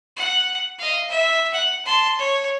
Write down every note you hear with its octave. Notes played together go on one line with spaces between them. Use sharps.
F#5
D#5 F5
E5
F#5
A5 C6
C#5